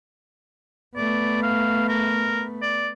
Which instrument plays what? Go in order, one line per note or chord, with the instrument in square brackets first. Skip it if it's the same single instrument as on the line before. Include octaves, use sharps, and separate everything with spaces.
[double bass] A3 B3 [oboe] D5
[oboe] F5
A#4
D5